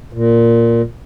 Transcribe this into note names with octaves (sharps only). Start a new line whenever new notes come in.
A#2